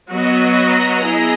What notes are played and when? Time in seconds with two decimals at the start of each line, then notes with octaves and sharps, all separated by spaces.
0.09 F#3 B3 F#4 B4 D#5
0.57 A#5
1.03 B3 E4 G#4